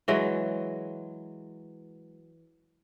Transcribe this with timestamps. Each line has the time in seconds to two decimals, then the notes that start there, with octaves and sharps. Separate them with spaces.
0.08 E3 F#3 G#3